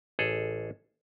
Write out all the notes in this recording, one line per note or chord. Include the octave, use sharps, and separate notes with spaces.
A1 G#4 A4